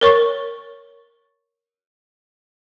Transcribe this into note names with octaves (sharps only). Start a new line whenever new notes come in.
A#4 C#5 C#6